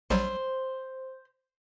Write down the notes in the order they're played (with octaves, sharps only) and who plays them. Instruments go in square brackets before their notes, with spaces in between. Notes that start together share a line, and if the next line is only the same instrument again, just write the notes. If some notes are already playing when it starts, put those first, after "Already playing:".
[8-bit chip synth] A#1 F#3 G3 [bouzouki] C5